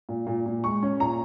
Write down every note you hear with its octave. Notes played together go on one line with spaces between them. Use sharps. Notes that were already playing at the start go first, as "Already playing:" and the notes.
A#2
A#2
A#2
G#3 C#6
C#4
A#2 A#5